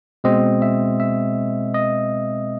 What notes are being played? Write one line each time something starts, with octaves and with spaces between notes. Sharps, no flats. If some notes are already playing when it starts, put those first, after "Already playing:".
B2 G#3 C4 D#5
E5
E5
D#5